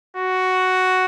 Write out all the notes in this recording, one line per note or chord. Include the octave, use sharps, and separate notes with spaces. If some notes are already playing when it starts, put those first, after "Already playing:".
F#4